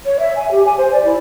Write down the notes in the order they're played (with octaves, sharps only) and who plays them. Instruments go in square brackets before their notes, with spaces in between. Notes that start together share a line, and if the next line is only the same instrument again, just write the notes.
[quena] C#5
E5
G#5
G4
G#5
C5
D5
E4